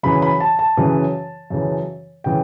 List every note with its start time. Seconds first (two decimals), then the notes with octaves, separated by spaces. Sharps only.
0.03 F#2 C#3 E3 B5
0.22 B5
0.40 A5
0.59 A5
0.77 F#2 C#3 E3
1.50 F#2 C#3 E3
2.24 C#3 E3 G5